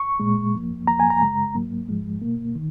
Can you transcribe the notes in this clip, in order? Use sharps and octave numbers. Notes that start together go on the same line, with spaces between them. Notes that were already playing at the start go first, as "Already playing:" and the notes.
Already playing: C#6
A#2 G#3
F2 F3 A#3
F2 F3 A#3 A#5
G#5
A#5
F#2 C#3 G#3
G#2 F#3 A#3
G#2 F3 G#3
B2 A#3
D#3